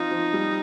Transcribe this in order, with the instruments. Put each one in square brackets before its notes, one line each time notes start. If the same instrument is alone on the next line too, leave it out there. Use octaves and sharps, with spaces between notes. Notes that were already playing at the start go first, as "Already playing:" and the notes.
Already playing: [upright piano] F3 C4 F4 [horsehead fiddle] D#4
[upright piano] F3
G3